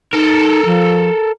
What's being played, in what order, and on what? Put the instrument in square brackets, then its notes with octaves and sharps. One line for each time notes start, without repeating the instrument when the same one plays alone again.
[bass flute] D#4 [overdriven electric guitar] A4 A#4
[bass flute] F3